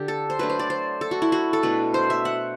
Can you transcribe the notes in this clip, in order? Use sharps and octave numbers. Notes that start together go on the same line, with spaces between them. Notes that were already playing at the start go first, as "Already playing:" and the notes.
Already playing: D3 G4
A4
C5
F#3 A3 D4 B4
C5
D5
C5
A4
F#4
E4
F#4
A4
B2 A3 D4 B4
C5
E5
F#5